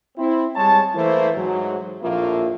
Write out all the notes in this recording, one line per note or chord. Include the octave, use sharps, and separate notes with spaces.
C4 E4
G3 G#3 C#5 A5
E3 A3 A#3 E4 C5
G#2 F#3
A#1 F2 A2 A#3 F4 E5